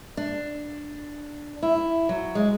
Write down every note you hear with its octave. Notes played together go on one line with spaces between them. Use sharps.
D4
E4
F#3
G#3